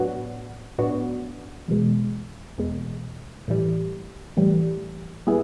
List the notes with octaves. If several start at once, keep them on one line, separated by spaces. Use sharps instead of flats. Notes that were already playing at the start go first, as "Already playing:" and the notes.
Already playing: A2 F#3 B3 D4 F#4
A2 F#3 B3 D4 F#4
E2 B2 G#3
E2 B2 G#3
A2 E3 G3
A2 E3 G3
A#2 G3 B3 E4 G#4